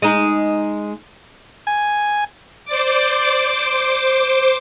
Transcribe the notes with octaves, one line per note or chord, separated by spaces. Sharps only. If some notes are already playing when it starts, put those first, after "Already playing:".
G#3 D#4
G#5
C5 D5 D6
C5 D6